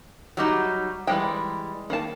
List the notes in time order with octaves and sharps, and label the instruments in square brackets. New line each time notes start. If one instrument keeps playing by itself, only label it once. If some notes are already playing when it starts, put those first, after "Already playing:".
[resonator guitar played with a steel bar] F#3 G3 D#4
[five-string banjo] E3 G3 G5 [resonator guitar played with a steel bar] G#3
[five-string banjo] D#3 A#3 A5